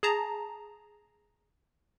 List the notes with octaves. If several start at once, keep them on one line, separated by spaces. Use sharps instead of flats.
G#4 A5 A#5